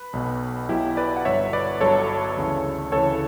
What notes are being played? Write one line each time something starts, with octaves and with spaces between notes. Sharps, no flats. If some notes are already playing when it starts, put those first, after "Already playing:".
Already playing: B4
B1 B2 F#3
B1 B2 F#3 E4 G4
B4 D5
F#5
G1 G2 F#3 C#5 E5
B4 D5
G1 G2 F#3 A4 C#5
D2 C#3 E3
D2 C#3 E3 A4 C#5